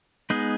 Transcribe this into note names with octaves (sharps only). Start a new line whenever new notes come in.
G#3 B3 D#4 G#4 B4